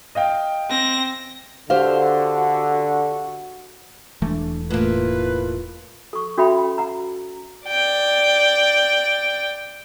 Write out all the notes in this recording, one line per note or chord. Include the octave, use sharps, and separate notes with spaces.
D#5 F5 G5
C4 A#6
D3 F#4 G4 C5 F5
E1 E3 A3 D4
A2 A#3 F4 B4
A4 C#6
C#4 F#4 A4 E5 G5 B5
F#5 A#5
D5 G5